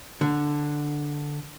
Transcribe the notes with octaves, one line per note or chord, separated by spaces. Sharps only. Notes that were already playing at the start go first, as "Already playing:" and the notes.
D3